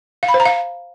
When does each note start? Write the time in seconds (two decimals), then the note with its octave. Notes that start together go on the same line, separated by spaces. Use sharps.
0.23 F5
0.28 B5
0.34 C5
0.40 A#5
0.46 F5